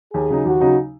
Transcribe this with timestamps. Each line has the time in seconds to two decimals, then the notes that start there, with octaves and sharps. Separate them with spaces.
0.14 D#2 G#4
0.30 C#3 F#3 D#4
0.45 D#2 F#4
0.60 C#3 F#3 D#4